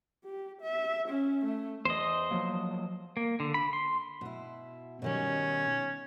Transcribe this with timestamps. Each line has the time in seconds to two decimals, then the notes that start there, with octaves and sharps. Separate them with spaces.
0.25 G4
0.62 E5
1.09 C#4
1.45 A3
1.85 E2 C5 D#5
2.31 F3 F#3 A#3
3.17 A#3
3.40 D3
3.54 B5
3.73 C6
4.21 B2 E4
5.02 B2 D#3 G3 C#4